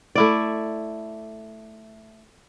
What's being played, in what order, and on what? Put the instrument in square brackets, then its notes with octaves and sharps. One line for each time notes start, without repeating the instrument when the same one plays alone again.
[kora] A3 E4 D5